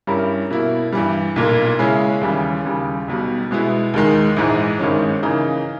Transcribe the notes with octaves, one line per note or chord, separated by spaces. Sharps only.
G2 G3 C#4 E4 A#4
B2 A#3 E4
G2 E3 G3
B1 A#2 A#3
C#3 G#3 C#4 E4
D#2 C#3 E3 G3
D#2 C#3 G3
B1 B2 G3
B2 G#3 B3 E4
D#2 D#3 G#3
A#1 G#2 E3 G#3
G#1 G2 D#3 G#3 C#4
C#3 E3 A#3 D#4